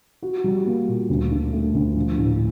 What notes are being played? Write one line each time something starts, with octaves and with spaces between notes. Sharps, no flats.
F#4
G3
A#3
A#2
D2
D3
A3
D2
A#1
A2